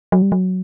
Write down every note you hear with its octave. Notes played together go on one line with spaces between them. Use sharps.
F#3
G3
F#3